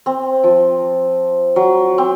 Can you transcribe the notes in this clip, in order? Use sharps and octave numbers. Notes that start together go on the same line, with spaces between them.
C4
F3
F#3
C4